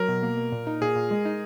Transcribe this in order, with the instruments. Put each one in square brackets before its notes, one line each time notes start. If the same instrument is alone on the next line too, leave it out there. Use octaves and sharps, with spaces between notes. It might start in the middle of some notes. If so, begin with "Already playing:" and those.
Already playing: [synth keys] F#3 [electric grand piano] A#4
[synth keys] B2
A#3
A#3
A#2
D#4
[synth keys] A#2 [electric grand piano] G#4
[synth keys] A#2
G#3
D#4